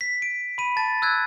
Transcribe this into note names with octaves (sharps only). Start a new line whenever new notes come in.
B6
D7
B5 D#7
A5 A6
E6 F#6 G#6